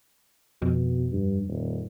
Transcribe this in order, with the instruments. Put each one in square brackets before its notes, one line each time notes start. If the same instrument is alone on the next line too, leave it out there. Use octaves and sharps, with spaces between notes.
[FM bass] F2 [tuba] B2
[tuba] G2
D#1